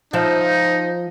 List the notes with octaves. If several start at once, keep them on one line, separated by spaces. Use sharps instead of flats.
F3 D#4 C5 E5